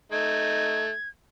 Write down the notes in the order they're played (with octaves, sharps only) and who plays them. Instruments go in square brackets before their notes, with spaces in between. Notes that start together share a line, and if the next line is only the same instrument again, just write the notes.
[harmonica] A3 D#4 [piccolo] G#6